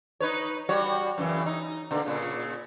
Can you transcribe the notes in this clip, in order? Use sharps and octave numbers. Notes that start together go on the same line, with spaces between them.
D#4 B4 C#5
G3 F#4 C#5
F#2 C#3 E3
D#4
B2 D3 A#3
A#2 C#3